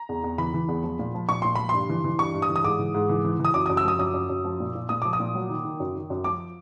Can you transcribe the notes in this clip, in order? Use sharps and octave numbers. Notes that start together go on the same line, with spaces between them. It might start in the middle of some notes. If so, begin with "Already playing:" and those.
Already playing: A#5
E2
E2
E3 B5
E3
E2
F3
A#2
F3
A#2 C#6
A#2 C6
F3 B5
G2 C6
E3
E3
G2 C#6
G2
D#6
E3
D#6
G#2 D6
E3
G#2
E3
E3
E3
D#6
F#2 D6
F#2 D#6
E6
F3 D#6
F#2 D#6
F#2
F#2
F3
A#2
A#2
A#2 D#6
F3 D6
D#6
A#2
F#3
D#3
D#3
F#2
D#3
F#2
F3 D6